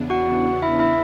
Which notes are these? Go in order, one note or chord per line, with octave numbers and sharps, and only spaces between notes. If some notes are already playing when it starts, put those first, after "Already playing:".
Already playing: E2 C#3 E3 B3 D4
F#4 F#5
E4 E5
E4 E5